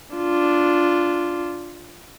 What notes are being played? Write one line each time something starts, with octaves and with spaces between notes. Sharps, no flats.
D4 F4